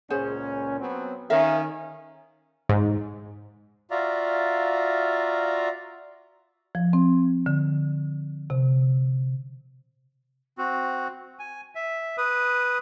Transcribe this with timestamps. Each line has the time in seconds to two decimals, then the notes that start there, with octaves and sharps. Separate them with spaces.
0.10 C#2 A#2 C#4 G#4 C5 F#5
0.79 F#3 B3 C4
1.30 D#3 C#4 A#4 E5 F5
2.69 G#2
3.91 F4 F#4 D5 E5 F5 A#5
6.75 F3
6.93 C4
7.46 D3
8.50 C3
10.58 C4 F#4
11.39 G#5
11.75 E5
12.18 B4 D#6